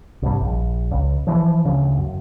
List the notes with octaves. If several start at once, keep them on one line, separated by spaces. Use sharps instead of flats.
C2 G2
A#1
C#2
E3 F3
D2 C#3
F#2